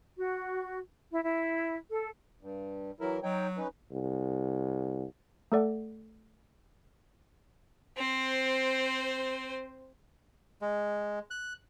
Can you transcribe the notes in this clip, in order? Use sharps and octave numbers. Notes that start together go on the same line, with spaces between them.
F#4
E4
E4
A4
G2
E3 F#3 E4 A#4
F#3 D#4 C#5 G5
C#4 D#4 B4
C2
A3 A4 D5 F#5
C4 C5
G#3
F#6